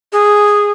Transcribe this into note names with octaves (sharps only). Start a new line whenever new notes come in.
G#4